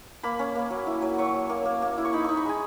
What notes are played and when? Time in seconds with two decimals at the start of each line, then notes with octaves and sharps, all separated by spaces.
0.23 A#3 B5
0.39 C#4
0.55 A#3
0.70 F#3
0.87 E4
1.02 F#3
1.18 F#3 C#6
1.34 F#3
1.50 A#3
1.65 A#3
1.82 A#3
1.98 E4
2.05 C#6
2.13 D#4 B5
2.24 D#4 C#6
2.37 B5
2.45 G#3 G#5